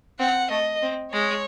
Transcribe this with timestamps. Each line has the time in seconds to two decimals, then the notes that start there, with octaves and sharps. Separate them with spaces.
0.19 C4 F#5
0.50 A3 D#5
0.83 C4
1.13 G#3 C#5